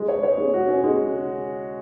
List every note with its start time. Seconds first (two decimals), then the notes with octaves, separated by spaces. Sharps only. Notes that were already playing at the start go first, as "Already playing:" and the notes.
Already playing: G#3
0.08 C#5
0.23 C#5
0.38 G#3
0.54 F#4
0.68 C#4
0.84 G#3